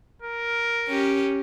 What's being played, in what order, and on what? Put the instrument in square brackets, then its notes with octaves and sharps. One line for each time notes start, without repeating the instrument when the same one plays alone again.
[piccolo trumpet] A#4
[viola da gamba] C#4 G4